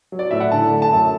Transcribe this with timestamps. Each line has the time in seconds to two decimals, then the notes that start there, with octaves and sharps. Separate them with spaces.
0.12 F#3
0.19 D5
0.31 A2 E5
0.40 F#5
0.51 D3 A5
0.71 A3
0.82 A5
0.93 F#2